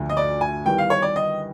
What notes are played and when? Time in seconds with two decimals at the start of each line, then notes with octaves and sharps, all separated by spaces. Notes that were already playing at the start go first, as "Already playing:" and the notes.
Already playing: D2 D3 F3 A3
0.10 D#5
0.17 D5
0.41 G#5
0.65 D#3 G3 B3 E4 G5
0.78 F5
0.90 C#5
1.02 D5
1.16 D#5